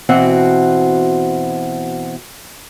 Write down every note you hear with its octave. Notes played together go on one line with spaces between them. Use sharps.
B2 E3 C4 F#4 F#5